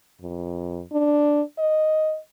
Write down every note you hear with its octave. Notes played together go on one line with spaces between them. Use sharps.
F2
D4
D#5